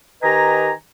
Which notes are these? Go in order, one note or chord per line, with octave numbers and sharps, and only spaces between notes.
D#3 G4 B4 D#5 G#5 A#5